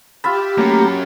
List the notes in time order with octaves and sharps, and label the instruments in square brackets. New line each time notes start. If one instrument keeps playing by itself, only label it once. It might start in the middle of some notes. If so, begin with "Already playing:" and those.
[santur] F4 E5 B5 [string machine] G4
[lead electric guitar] F#3 C#4 [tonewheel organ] A3 A#3 A#5